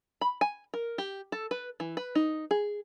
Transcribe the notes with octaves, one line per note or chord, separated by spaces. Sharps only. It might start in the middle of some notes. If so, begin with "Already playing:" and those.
B5
G#5
A#4
G4
A4
B4
E3
B4
D#4
G#4